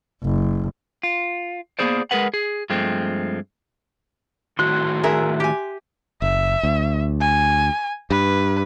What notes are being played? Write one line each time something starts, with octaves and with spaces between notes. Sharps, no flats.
F#1
F4
A#3 B3 G#4 C5 D5
G#3 G#4 A#4 B4 F#5
G#4
G2 F3 G#3 A3 C4
A2 D#3 F#4 C6 F#6
G#4 A#4 E5
G4 G#5
F#1 E5
D2
G#5
G2 B4